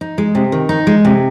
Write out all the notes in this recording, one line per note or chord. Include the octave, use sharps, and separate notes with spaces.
D#4
G#3
C3
D#3
D#4
G#3
C3